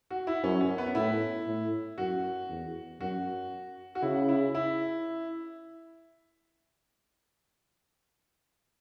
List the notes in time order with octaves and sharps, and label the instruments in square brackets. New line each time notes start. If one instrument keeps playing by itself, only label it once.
[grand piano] F#4
E4
[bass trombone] F#2 [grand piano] C#4
[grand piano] C#4
B3
[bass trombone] A2 [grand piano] E4
[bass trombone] A2
[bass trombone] F#2 [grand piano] F#4
[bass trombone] E2
[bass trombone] F#2 [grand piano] F#4
[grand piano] F#4
[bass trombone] C#3 [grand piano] E4
[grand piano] E4
E4